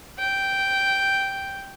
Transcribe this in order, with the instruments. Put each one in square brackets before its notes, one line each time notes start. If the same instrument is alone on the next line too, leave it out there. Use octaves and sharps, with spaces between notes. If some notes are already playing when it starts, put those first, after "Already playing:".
[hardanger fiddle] G5